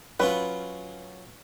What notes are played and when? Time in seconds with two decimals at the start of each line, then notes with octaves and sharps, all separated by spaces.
0.20 F#3 C#4 F4 B4